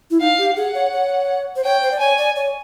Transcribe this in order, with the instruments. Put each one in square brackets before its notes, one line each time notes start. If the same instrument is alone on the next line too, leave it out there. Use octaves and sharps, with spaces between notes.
[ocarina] E4
[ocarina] D#4 [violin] F5
[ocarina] G4
[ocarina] G#4 [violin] F#5
[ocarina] C#5
C#5
C5
[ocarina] C#5 [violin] G5
[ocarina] C5
D5
[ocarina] C#5 [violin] G#5
[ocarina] D5
C#5